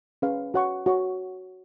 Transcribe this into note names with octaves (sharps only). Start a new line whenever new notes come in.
C#4 G#4 B4 F5
F#4 C#5 F#5 C#6
F#4 C#5 F#5 C#6